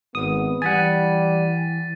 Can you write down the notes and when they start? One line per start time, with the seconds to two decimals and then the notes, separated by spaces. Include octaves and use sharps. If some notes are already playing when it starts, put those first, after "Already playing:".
0.15 G#1 B3 D#6
0.62 E3 G3 F#5 G#5 A6 B6 D#7